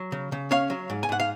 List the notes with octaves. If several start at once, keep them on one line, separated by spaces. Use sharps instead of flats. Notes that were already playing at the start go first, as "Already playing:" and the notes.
Already playing: F#3
C#3
C#3
C#4 C#5 F5
F#3
G#2
G#5
G#2 F#5
F5